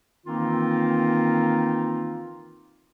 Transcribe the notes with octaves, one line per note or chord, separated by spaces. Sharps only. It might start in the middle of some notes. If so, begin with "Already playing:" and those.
D#3 E3 A#3 C4 D#4 F4